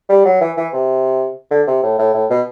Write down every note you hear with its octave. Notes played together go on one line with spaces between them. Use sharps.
G3
F#3
E3
E3
C3
D3
C3
A2
A2
A2
B2